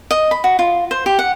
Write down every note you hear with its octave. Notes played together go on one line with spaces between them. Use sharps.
D#5
B5
F#4
F4
C5
G4
F#5